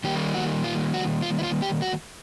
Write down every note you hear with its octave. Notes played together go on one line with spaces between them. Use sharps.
D#3 G3 A#3 G4
F#4
F4
F#4
F4
E4
F4
G4
F#4